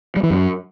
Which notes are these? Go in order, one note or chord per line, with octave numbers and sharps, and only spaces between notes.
G3
E3
F#2